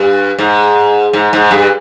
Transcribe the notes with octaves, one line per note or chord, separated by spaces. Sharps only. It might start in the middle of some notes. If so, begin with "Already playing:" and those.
Already playing: G2
G#2
G#2
G#2
G2